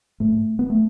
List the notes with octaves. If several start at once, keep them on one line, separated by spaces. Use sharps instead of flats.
G#2 A3
B3
A3